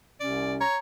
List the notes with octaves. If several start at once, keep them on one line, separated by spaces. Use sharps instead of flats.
C2 C3 C#4 D5
C#5 A#5